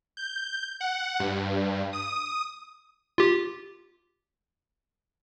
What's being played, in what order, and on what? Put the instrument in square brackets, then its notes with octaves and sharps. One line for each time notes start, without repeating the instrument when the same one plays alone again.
[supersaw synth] G6
F#5
G2
D#6
[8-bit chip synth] F4 G4